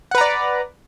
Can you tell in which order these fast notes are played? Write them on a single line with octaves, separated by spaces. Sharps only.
F#5 B4 A#5 D5